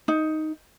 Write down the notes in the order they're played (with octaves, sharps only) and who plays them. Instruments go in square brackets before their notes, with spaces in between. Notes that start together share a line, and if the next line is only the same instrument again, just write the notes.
[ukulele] D#4